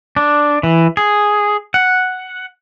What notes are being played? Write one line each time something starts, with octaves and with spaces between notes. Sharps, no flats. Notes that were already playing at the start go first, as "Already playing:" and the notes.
D4
E3
G#4
F#5